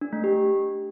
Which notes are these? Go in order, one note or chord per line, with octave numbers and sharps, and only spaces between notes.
D4
A3
G4